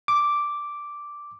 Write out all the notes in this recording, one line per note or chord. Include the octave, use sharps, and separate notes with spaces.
D6